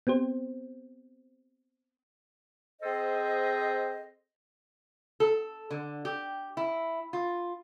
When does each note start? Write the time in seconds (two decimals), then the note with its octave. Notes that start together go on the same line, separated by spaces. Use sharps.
0.07 B3 C4 G4 C5
2.82 C4 G#4 A4 C5 D#5
5.20 A4
5.71 D3
6.05 G4
6.57 E4
7.13 F4